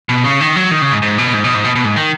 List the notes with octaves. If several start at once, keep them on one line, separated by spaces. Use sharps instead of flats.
B2
C#3
D#3
F#3
D#3
C#3
G#2
G#2
B2
G#2
B2
G#2
B2
B2
G#2
D#3